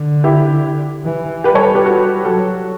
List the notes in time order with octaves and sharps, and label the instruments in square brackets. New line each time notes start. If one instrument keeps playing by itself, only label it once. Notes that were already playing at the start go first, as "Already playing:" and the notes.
Already playing: [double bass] D3
[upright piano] E4 G4
[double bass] E3
[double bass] G3 [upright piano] G4 B4
[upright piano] A4 C#5
G4 B4
F#4 A4
[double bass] F#3 [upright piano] F#4 A4